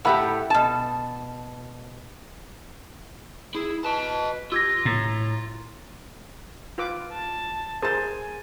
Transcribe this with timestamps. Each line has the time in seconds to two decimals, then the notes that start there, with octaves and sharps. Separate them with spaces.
0.05 A2 A3 G4 F#5 B5
0.50 B2 A5
3.55 E4 G#4
3.85 B4 D#5 A5
4.52 F4 G4 E6 G#6 A#6
4.85 A2 A#5
6.78 F4 B4 D6
7.13 A5
7.82 G#4 A#4 C5 G#5 A5 A6